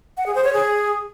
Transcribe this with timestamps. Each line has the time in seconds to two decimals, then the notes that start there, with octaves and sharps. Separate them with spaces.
0.17 F#5
0.26 G#4
0.35 C5
0.44 C#5
0.53 G#4